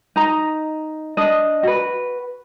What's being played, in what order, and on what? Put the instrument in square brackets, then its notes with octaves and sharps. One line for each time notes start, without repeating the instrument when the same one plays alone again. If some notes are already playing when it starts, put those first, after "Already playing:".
[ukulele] D#4 A#5
D4 D#5
F#4 B4